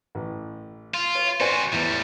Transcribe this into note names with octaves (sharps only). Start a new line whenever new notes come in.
A1
F4
C#5
C4 F#4 C5 D5 G#5
E2 A2 G3